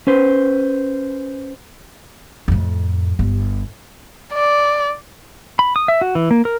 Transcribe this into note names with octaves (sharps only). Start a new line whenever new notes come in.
C#4 B4 C5
F2 A2
G1
D5
B5
D#6
E5
F#4
E3
A#3
A#4